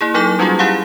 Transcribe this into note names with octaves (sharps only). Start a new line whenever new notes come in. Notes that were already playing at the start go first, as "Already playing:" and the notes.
A#3 E4 G#4
F#3 D#4 A4 D6 G6
G3 C#4 D#4 F4 F#4 G#4
E4 G4 G#4 F5 F#5